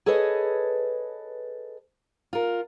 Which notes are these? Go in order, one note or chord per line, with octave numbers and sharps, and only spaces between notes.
G#4 A4 B4 C#5 D#5
F4 A#4